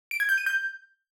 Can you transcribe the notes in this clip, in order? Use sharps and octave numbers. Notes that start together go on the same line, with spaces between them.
D7
G#6
G6
D#7
G6